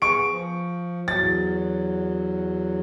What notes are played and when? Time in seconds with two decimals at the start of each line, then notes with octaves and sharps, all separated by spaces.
0.02 B3 G#4 C#6 D7
0.30 F3
1.08 E2 F#3 A6